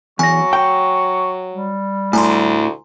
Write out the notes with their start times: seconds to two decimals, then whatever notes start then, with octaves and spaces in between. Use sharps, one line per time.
0.19 E2 F#3 G#5 C#6 A#6
0.53 G5
1.54 G3
2.13 D2 A2 G#5 A#5 C6